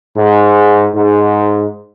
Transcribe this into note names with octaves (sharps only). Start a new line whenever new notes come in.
G#2
G#2